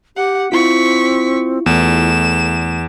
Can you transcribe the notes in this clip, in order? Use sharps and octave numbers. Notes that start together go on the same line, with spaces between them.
G4 F#5
C4 E4 F4 C#6 B6
E2 A3 E7